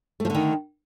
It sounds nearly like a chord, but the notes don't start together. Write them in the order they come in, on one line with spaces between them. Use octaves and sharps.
A3 F3 D3 D#3